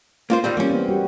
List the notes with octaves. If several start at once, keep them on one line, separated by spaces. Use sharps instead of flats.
A#3 F4 C5
D#3 G3 C4
E3 G3 A#3 C#4
B3 C4
G3 F#4